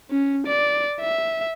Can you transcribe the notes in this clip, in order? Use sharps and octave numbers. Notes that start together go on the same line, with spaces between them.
C#4
D5
E5